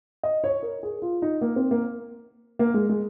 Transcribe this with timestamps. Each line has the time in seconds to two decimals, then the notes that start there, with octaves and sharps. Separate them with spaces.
0.23 D#5
0.44 C#5
0.63 A#4
0.83 G#4
1.02 F4
1.22 D#4
1.41 A#3
1.56 C4
1.71 A#3
2.59 A#3
2.74 G#3
2.89 G#3